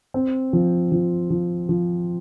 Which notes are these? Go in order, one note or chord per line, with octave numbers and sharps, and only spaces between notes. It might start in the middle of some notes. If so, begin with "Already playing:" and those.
C4
F3
F3
F3
F3